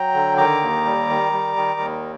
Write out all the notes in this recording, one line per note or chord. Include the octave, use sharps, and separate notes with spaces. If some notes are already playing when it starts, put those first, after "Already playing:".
Already playing: F#3 G5 A#5
D3
D#3 A#5 D6
D#2
G3
D#3
G3
D#3
D#2